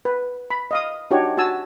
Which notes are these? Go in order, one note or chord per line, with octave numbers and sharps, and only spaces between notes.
B4
B5
D#5 F5 D#6
D4 D#4 F#4 G4 C#5
F#4 G#5 A5 E6